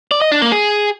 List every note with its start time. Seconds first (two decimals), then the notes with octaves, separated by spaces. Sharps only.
0.11 D5
0.22 D#5
0.32 D4
0.42 A#3
0.52 G#4